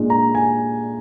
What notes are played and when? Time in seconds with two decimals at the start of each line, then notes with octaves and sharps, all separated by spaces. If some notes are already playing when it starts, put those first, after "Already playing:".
Already playing: A#2 G#3 D4
0.10 A#5
0.35 G#5